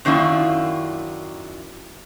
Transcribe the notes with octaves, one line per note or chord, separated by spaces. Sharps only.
F#2 D#3 A#3 D4 E4 F4